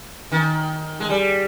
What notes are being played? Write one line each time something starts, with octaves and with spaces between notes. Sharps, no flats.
D#3
G#3
G3